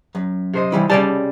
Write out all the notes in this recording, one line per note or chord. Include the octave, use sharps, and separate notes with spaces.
F#2
C3 C5 D#5
E3 G3 E4
C#3 G3 D5 A5